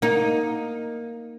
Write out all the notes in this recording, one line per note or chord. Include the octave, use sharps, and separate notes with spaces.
A#3 D#4